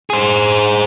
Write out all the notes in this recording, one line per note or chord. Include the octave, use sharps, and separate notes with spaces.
G#4 C5